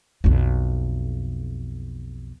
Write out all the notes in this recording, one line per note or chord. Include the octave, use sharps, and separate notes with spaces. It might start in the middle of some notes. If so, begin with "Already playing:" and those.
B1 F2